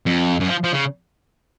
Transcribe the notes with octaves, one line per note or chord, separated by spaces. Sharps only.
F2
F#2
F3
F3
C#3